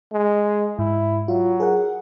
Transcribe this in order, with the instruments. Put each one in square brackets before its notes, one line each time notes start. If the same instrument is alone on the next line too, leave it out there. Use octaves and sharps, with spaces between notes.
[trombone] G#3
[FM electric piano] G#2 [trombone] E4
[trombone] F#3 [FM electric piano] F4
[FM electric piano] G#4 A#4 F#5